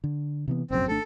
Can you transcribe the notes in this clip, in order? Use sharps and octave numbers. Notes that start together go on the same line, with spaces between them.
D3
C3 E3 B3
F1 A#1 F#2 C4
G#1 A3 D4 A4